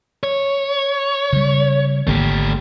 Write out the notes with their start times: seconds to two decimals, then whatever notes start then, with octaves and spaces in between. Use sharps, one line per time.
0.23 C#5
1.33 C#3 G3
2.07 G#1 D3 A3 A#3 G4